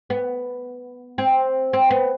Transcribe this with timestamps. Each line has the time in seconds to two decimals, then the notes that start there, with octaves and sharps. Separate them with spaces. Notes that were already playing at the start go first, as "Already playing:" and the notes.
0.10 B3
1.18 C4
1.73 C4
1.91 B3